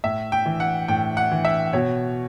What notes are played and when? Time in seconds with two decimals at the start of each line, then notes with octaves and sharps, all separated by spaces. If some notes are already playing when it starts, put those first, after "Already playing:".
0.04 A2 E5
0.32 G5
0.46 E3
0.60 F#5
0.88 A2 G5
1.17 F#5
1.31 E3
1.45 E5
1.73 B2 C#5